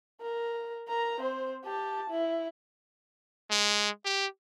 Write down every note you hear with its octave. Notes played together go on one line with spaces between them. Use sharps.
A#4
A#4 A#5
C4 C5
G4 A5
E4
G#3
G4